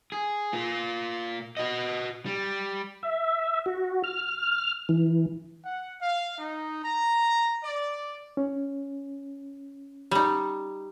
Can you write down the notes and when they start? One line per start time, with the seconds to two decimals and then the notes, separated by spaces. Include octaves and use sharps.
0.12 G#4
0.53 A#3 F4
1.57 F#4 D#5
2.26 G3
3.03 E5
3.66 F#4
4.04 F6
4.89 E3
5.63 F#5
5.99 F5
6.37 D#4
6.82 A#5
7.62 D5
8.37 C#4
10.11 G3 D#4